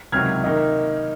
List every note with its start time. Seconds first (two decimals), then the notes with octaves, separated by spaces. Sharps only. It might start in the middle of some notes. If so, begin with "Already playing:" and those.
0.12 C#2 C3 D#3 F#3 F6 G#6
0.44 D#3 A#3 D#4